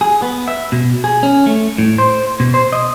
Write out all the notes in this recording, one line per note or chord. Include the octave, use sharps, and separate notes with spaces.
G#4
B3
E5
B2
G#4
C#4
A3
A2
C5
B2
C5
D#5